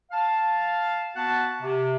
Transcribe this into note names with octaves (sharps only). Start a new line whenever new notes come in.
F5 A5
B3 F#4 F#5 A5
C3